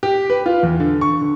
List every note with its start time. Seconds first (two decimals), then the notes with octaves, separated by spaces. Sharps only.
0.03 G4
0.30 B4
0.46 F4
0.63 E2
0.80 D3
1.01 C#6
1.21 D3